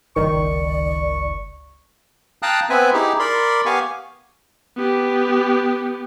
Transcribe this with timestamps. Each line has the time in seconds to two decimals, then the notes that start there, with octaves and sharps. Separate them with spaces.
0.16 G1 C#2 D#3 D5 C#6
2.42 F5 G5 A5 A#5 D#6 F#6
2.70 B3 C4 B4 E5 G#5
2.93 D#4 E4 G4 G#4
3.20 A#4 D5 B5 C6
3.66 B3 G4 F5 G#5 C#6
4.77 B3 G4